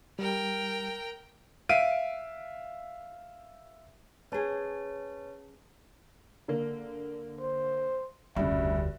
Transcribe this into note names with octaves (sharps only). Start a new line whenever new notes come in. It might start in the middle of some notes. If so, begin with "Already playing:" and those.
G3 A#4 G5
E5 F5 D7 D#7
C#4 G#4 B4 C#5 A5
D3 A#3
C5
F1 D2 G2 C#3 E5